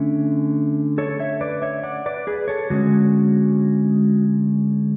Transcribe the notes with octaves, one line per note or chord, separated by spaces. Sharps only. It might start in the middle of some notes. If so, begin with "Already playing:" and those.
Already playing: D3 A3 C#4 E5
A4 C#5
C#5 E5
B4 D5
C#5 E5
D5 F#5
B4 D5
G#4 B4
A4 C#5
D3 G#3 C#4 F#4